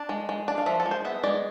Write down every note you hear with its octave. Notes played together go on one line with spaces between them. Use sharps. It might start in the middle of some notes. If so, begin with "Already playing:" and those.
Already playing: D4
G#3
G#3
D4
F5
F3 E5
A4
G#3
C5
B3 E5
G#3 D5